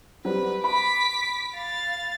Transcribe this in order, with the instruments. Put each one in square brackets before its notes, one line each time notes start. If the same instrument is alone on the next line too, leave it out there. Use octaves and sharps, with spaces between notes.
[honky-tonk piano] F#3 G3 C4 [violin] B4
[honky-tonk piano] B5 [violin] D6 B6
[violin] F5 A6